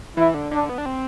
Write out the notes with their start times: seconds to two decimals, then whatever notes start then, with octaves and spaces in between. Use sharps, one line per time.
0.16 E3 E4
0.34 D3
0.51 D3 D4
0.69 B3
0.78 D4
0.86 C4